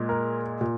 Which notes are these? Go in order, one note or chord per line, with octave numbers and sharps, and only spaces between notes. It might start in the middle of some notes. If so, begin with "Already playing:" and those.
Already playing: A#2 G#3
A#4
A#2